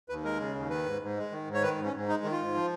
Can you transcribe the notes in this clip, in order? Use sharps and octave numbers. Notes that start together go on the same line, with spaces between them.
D#2 B4
G#3 A#4
C#3
D#2
D#3 B4
G#2
G#2
G#3
D#3
G#2
C#5
D#3 B4
G#2
C#4
G#2
G#3 D#4
D#3
F4
G#2
F3